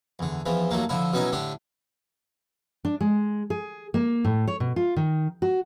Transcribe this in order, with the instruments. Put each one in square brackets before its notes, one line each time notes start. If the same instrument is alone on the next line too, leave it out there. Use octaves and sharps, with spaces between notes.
[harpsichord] E2 D3
E2 E3 F3
D#2 F#3 A3 A#3
D3 F3 E4
B2 F#3 B3 C#4 D#4 E4
A2 D3 D4 G4
[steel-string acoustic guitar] D4
G#3
G#4
A#3
A2
C#5
B2
F4
D#3
F#4